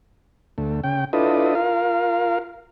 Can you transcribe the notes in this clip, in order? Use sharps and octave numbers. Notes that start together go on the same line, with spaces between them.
D2 A3
C#3 G5
D4 E4 F4 A4 B4 D#5
F4 A#4 F5